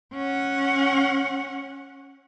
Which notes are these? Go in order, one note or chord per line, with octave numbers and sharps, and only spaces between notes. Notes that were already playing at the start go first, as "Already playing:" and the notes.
C#4 F#5